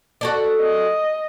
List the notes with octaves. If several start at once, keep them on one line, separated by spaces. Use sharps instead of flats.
F#4 A4 D5
D#5